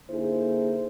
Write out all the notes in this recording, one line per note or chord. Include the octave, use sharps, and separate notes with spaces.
D3 A#3 D#4 E4 G#4 C5